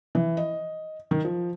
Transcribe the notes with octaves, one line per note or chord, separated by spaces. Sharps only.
E3
D#5
D#3
F3